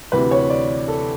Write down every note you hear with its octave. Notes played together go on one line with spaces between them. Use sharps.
D2 C3 E3 B4
C#5
D5
A4